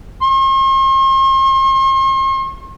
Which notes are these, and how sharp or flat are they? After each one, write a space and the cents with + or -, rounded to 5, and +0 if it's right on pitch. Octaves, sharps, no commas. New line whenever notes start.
C6 +45